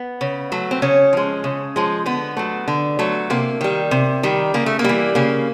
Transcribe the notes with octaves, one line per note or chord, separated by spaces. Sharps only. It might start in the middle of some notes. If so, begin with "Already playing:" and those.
Already playing: B3
C#3
F#3 A3
C4
C#3 C#4
F3 G#3
C#3
F3 G#3
D3 B3
F#3 A3
D3
F#3 A3
C3 A#3
D#3 G3
C3
D#3 G3
C#3 A#3
A3
A#3
E3 G3
C#3 A#3